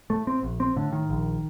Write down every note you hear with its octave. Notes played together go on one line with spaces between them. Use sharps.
A2 A3
C4
A#1
C4
A2 D3
D#3
A#1